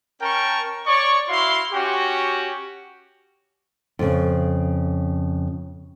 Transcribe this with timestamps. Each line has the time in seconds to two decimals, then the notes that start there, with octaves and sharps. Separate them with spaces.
0.22 C#4 A#4 G5 A5 C#6
0.86 C#5 D5 C#6
1.29 E4 F#4 F5 C6
1.73 C#4 F#4 G4
3.99 F2 C#3